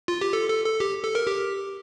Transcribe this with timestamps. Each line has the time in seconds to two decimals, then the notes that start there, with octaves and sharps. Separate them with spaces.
0.08 F4
0.21 G4
0.33 A4
0.49 A4
0.65 A4
0.80 G4
1.04 A4
1.15 A#4
1.27 G4